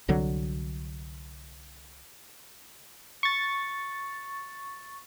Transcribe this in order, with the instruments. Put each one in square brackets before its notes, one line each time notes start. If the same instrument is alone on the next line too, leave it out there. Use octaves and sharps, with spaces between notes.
[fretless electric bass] C2 D3 F#3
[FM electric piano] C#6 A6